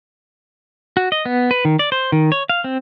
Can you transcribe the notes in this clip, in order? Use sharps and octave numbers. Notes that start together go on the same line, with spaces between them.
F#4
D#5
B3
B4
D#3
D5
C5
D#3
C#5
F5
C4